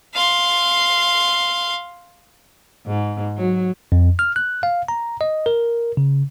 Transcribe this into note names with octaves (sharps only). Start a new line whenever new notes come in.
F5 C6
G#2
F#3
F2
F6
F#6
F5
A#5
D#5
A#4
C#3